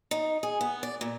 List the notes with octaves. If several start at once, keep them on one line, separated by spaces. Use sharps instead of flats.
D#4
G#4
B3
D5
A#2